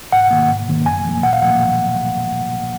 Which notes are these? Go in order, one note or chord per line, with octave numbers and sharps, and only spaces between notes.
G#2 F#5
D#3 A#3
G#2
D#3 A#3
F#2 G#5
F3 A#3
A#2 F#5
F5
F3 A#3 F#5